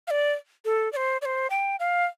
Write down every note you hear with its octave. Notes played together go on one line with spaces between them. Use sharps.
F5
D5
A4
D5
C5
D5
C5
G5
F5